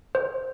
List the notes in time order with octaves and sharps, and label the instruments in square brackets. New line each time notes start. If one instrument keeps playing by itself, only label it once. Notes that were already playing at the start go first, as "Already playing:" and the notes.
[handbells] C5